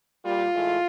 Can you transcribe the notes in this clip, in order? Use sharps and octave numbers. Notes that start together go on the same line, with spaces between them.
A#2 G3 F4
A2 E3 G#3